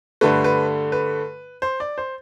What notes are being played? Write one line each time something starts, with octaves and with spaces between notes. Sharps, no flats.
G2 D3 A3 B4
B4
B4
C5
D5
C5